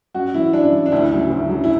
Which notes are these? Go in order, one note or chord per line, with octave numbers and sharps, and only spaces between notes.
F#2 F#4
E3 E4
F#2 D4
E3
D4
D2 E4
C#3 F#3
D2
C#3 F#3
E4